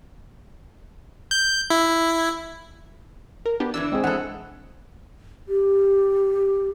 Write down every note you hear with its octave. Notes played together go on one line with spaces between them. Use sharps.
G6
E4
A#4
B3 D4 G4
D3 E3 D4 E6
G#3 C4 G#4
E3 A4 F#5
G4